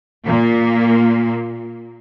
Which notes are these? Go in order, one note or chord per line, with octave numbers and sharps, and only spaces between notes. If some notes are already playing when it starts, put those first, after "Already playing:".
A#2 A#3